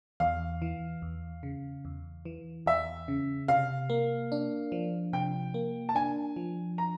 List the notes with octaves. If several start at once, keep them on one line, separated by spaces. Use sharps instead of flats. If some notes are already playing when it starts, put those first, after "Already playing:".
E2 F5
E3
E2
C#3
E2
E3
E2 E5
C#3
C3 F5
A#3
D4
F3
C3 G5
A#3
A5
D4 G#5
F3
A#5